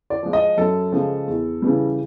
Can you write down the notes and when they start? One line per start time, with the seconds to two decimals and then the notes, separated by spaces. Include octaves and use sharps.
0.10 D5
0.23 F3 G#3
0.33 D#5
0.57 F#2 A4
0.92 C#3 F3 G#3
1.27 E2
1.62 C#3 E3 G3